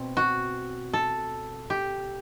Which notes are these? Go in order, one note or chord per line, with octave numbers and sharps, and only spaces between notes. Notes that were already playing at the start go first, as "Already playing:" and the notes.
Already playing: B2 C4
F#4
A4
G4